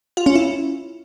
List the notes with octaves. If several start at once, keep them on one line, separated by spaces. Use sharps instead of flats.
F4
C#4
E4